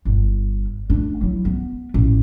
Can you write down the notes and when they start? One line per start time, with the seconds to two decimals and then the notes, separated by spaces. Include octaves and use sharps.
0.05 G1
0.90 A3 D4
1.21 F#3 E4
1.45 B3
1.94 A1